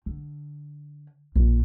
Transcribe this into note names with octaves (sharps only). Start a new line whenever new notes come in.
D3
A#1